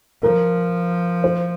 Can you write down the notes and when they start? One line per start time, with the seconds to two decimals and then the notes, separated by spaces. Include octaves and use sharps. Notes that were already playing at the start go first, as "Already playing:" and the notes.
0.23 F3 A#4
1.24 C5